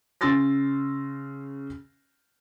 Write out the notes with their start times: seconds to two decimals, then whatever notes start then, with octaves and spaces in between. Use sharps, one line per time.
0.21 C#3 C6 E6 A6 A#6